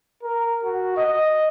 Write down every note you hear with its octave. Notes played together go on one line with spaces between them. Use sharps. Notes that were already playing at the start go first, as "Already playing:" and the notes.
A#4
F#4
D#5